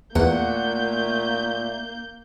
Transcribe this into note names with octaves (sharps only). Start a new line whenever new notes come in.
E2 A#2 D#3 A3 A#3 F#5 G6